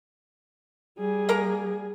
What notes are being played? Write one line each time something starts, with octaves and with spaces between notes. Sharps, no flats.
G3 G#4
A#3 A#4 A#5